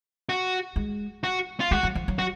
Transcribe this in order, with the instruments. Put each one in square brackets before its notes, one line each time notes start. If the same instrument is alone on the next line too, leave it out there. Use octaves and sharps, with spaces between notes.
[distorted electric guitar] F#4
[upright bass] G#3
[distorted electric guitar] F#4
F4
[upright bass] G#3 [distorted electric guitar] F#4
[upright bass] F#3
F3
F#3
[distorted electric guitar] F#4